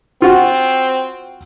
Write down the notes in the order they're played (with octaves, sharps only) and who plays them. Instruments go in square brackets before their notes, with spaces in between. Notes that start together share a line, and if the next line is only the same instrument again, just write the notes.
[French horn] C4 [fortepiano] F4 F#4